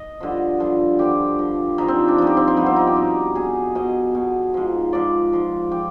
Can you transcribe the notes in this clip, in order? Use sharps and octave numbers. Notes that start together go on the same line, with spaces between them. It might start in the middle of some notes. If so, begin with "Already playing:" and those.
Already playing: D#5
G2 D3 F3
G2 D3 F3
G2 D3 F3 G4
G2 F3
G2 F3 D#4
C4
D4
G2 F3 D#4
G4
C4
C4
G2 F3 B3
C4
D#4
G4
B2
B2 G#4
B2 D#5
B2
G#2 F3
G#2 F3 D5
G#2 F3
F3 G4